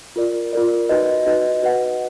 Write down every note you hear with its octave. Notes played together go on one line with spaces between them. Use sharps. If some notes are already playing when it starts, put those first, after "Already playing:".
F4 A#4 D5
F4 A#4 D5
D#4 F#4 B4 D#5
D#4 F#4 B4 D#5
F#4 B4 D#5 F#5